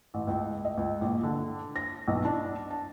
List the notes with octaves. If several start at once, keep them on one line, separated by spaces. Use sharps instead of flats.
A1
C#2
D#5
C#2
A#1
D3
A#6
B1
D4
A5